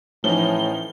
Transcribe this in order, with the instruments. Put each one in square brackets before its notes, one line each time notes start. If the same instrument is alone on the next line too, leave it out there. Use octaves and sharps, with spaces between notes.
[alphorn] A2 [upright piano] E3 C#4 [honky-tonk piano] F3 D#4 [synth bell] G7